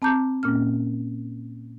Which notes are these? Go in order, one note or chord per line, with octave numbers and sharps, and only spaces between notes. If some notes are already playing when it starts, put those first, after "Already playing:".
C4 A5 A#5 D6 G6
A#2 A#3 C#4 F6